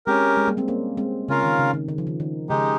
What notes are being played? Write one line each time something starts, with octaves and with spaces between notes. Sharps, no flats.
G#3 C4 C#4 G4 A#4
G#3
G3 A#3
G#3 C4
A#3 C#4
G#3 C4
C#3 C#4 F4 A#4 F5
D#3
C#3
D#3
D#3
F3
D#3
D#3
C#3 G#3 D#4 G4